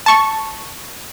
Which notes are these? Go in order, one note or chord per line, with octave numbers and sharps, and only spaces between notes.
A5 C#6